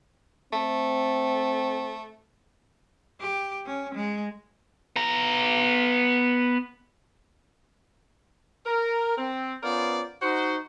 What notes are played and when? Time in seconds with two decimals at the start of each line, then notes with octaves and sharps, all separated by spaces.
0.53 A3 C4
3.21 G4
3.66 C#4
3.94 G#3
4.96 B3 A#5
8.66 A#4
9.18 C4
9.63 B3 C#4 F4 A#4 C5 D5
10.22 D#4 F#4 C5